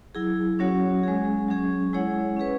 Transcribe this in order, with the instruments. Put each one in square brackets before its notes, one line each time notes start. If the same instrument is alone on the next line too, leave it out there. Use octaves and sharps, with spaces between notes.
[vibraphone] F#3 E4 G#4
F#3 C#4 F#4 C#5 F#5
G#3 C#4 G#4
F#3 C#4 G#4
G#3 E4 G#4 C#5 F#5
C#4 G#4 B4